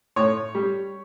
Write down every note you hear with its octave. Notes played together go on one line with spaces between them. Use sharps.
A2 C#5
G3